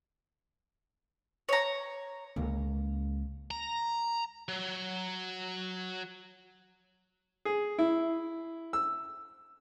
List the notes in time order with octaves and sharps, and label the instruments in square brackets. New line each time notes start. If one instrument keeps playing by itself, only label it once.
[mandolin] C#5 A#5
[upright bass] C#2 A#3
[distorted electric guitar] A#5
F#3
[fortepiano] G#4
E4
E6